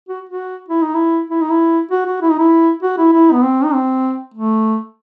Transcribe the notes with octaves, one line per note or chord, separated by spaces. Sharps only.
F#4
F#4
E4
D#4
E4
E4
D#4
E4
F#4
F#4
E4
D#4
E4
F#4
E4
E4
B3
C4
D#4
C4
A3